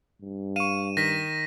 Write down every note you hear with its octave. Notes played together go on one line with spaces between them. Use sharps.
G2
F5 C#6 D#7 E7
D#3 A#6 B6